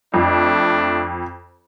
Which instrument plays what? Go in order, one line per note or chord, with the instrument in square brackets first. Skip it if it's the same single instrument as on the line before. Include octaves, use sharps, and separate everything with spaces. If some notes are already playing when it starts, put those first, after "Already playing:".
[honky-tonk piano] F2 [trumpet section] A3 D4